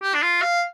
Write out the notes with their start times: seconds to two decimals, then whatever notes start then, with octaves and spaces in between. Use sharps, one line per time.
0.02 G4
0.14 D4
0.22 F4
0.42 F5